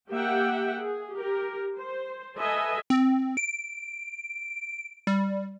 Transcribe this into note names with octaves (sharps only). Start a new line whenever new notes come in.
A#3 G4 E5 F#5 G5
G#4
G4 A#4
C5
A4 B4 D#5 E5 G#5
C4
D7
G3